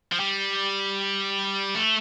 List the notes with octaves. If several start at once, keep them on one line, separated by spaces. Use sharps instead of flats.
F3
G3
A3